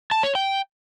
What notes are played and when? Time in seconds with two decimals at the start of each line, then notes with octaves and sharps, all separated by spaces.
0.11 A5
0.23 C#5
0.35 G5